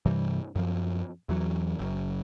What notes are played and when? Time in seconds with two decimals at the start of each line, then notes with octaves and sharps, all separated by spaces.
0.05 G2 C3 E3 G3
0.56 F#2 F3
1.29 E2 E3 F#3
1.79 F#1 F#2